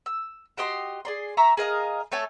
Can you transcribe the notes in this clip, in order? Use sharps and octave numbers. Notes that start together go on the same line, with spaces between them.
E6
F#4 G4 D#5 C6
G#4 D5 C6
E5 A#5 C#6
G#4 A#4 D#5 F5
A3 A4 C#5 G#5